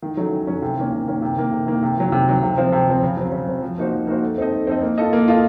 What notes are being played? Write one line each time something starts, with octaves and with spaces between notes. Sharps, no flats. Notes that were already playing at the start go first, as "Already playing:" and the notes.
D#3
F#3 A3 C#4
D#3
F#3 A3 C#4
C3
D#3 A#3 C#4
C3
D#3 A#3 C#4
C3
D#3 A#3
C3
D#3 A#3
C3
D#3 F#3
C3
D#3 F#3
C3
F3 C4
C3
F3 C4
C#3
F#3 C4
C#3
F#3 C4
F3
A#3 D#4 F#4 C5
F3
A#3 D#4 F#4 C5
A3
C4 D#4 A4 D#5
A3
C4 D#4 A4 D#5
A#3
F4 A4 D#5
A#3
F4 A4 D#5